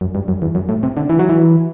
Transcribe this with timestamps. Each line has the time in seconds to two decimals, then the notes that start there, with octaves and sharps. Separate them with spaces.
0.01 F#2
0.15 G2
0.28 F#2
0.42 E2
0.55 F#2
0.69 A2
0.83 C3
0.97 D3
1.09 E3
1.19 F#3
1.29 E3